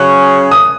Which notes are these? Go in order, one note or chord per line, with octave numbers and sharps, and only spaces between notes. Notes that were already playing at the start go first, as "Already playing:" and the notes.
Already playing: C#3 F#3 C#4 G#4 C#5 F#6
D#6